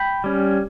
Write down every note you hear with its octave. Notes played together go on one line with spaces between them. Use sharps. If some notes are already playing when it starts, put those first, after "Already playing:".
Already playing: G5 B5
G3 C#4